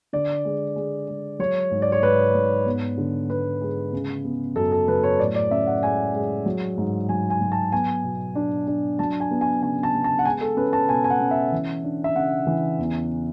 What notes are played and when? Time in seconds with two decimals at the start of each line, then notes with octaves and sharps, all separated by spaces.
0.13 D3 D5
0.45 G#3
0.76 G#3
1.08 G#3
1.39 F#3 C#5
1.71 G#2
1.82 D5
1.92 C#5
2.02 G#2 B4
2.35 G#2
2.66 B3
2.98 D3
3.30 B3 B4
3.61 G#3
3.93 C#3
4.25 B3
4.56 F#2 A4
4.72 A4
4.88 F#3 B4
5.03 C#5
5.20 A2 D5
5.35 D5
5.51 C#4 E5
5.67 F#5
5.82 G#3 G#5
6.14 G#3
6.46 F#3
6.78 G#2
7.09 F#3 G#5
7.30 G#5
7.41 F#3
7.52 A5
7.72 B3 G#5
8.04 B2
8.35 D4
8.68 D4
8.99 F#3 A5
9.20 G#5
9.31 B3
9.41 G#5
9.62 C#3 G#5
9.83 A5
9.94 B3
10.04 A5
10.19 F#5
10.25 G#3 G#5
10.41 A4
10.57 C#4 B4
10.73 A5
10.89 B2 G#5
11.04 G#5
11.10 F#5
11.21 C#4
11.31 E5
11.52 E3
11.84 D4
12.04 E5
12.15 C#3 F#5
12.47 E3
12.79 E2